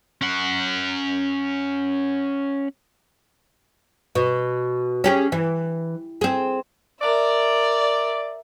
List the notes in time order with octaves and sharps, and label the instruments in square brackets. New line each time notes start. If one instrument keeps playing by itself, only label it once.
[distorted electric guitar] C#4 F#5
[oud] B2
C#4 G4 G#4
E3
C4 G#4
[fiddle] A#4 E5 [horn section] D5